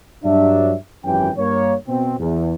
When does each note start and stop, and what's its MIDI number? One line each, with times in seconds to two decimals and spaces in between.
0.24 0.74 43
0.24 0.74 54
0.24 0.74 62
0.24 0.74 76
1.05 1.30 32
1.05 1.30 42
1.05 1.30 52
1.05 1.30 61
1.05 1.30 67
1.05 1.30 79
1.37 1.73 43
1.37 1.73 58
1.37 1.73 73
1.87 2.15 47
1.87 2.15 60
2.19 2.55 40